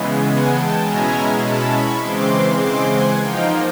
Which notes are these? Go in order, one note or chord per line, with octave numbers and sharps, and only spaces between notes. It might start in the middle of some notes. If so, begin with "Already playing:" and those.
Already playing: C#3 E3 G#3 B3
F#5 G#5
G5 A5
B2 G#3 C#4 E4 G#5 A#5
A5 B5
B5 C#6
C#3 E3 G#3 C4 C6 D6
C6 D6
F#5 G#5
F3 A#3 D#4 F5 G5